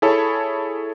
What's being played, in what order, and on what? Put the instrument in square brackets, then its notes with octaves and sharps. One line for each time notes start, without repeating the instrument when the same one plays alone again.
[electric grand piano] E4 G#4 A4 C#5 A5 B5